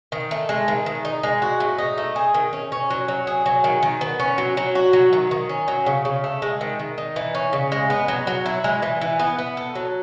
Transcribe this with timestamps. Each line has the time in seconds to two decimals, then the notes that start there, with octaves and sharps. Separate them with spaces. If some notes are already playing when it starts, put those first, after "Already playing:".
0.12 D#3
0.31 A3
0.49 G#3
0.68 D#3
0.86 D#3
1.05 D#4
1.23 G#3
1.42 F#4
1.60 A2
1.78 D#4
1.98 A3
2.16 G#4
2.34 D#3
2.53 C#4
2.72 C#4
2.90 F#3
3.08 F#3
3.27 G#4
3.46 F#3
3.64 D#3
3.83 D#3
4.01 B3
4.20 C#4
4.38 F#3
4.57 F#3
4.75 F#4
4.93 F#3
5.13 D#3
5.31 D#3
5.49 C#4
5.68 F#3
5.86 C#3
6.05 C#3
6.24 A3
6.42 G#3
6.61 D#3
6.79 D#3
6.98 D#4
7.16 E3
7.35 C#4
7.53 C#3
7.72 G#3
7.90 B3
8.08 F#3
8.27 F#3
8.46 E4
8.64 G#3
8.82 E3
9.01 E3
9.19 B3
9.39 B3
9.57 A4
9.75 F#3